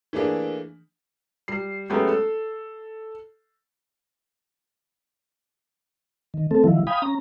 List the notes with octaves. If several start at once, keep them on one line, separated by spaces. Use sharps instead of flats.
E3 A3 A#3 D4 G#4
G3 C7
F#3 G#3 A3 B3 C#4 G4
A4
D#3
A3 C4 A4
D#3 F3 F#3 E4
F5 G5 G#5 B5 D#6
C#4 A#5